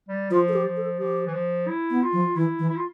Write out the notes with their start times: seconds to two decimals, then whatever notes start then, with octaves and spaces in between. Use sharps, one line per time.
0.09 G3
0.31 F3 F4
0.48 A4
0.54 G4
0.65 F3
0.77 A4
0.99 F3 G4
1.26 E3
1.33 F3
1.68 E4
1.90 B3
2.02 F4
2.13 F3
2.35 E3 E4
2.59 E3
2.70 E4
2.77 F4